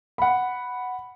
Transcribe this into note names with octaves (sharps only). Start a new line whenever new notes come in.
F#5 B5